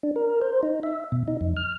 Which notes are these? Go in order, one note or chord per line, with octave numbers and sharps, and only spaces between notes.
D4
A#4
C5
D#4
E5
B2
D#4
F2
F6